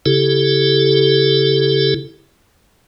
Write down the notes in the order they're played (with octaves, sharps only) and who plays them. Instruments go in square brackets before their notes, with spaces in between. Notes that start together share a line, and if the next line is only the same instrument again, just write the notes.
[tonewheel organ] C#3 E4 G4 A4